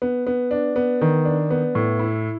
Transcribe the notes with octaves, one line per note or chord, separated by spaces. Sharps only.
B3
B3
D4
B3
D#3
D4
B3
A2
E4